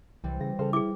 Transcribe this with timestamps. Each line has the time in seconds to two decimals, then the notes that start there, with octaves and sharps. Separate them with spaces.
0.24 C2 E3 G3 C4
0.40 C#3 A#6
0.59 C#3 A4 C5 F6
0.73 E4 G#4 D6